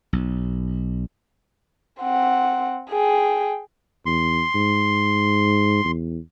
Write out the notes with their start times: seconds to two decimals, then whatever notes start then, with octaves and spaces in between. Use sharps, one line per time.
0.13 B1
2.02 C4 F#5
2.91 G#4 G5
4.06 E2 C6
4.55 G#2
5.84 E2